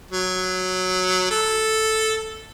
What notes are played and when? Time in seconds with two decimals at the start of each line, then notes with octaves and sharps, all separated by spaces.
0.11 F#3
1.31 A4